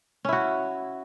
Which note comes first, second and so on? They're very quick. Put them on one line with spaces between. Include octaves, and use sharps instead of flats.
C#4 E4 F#4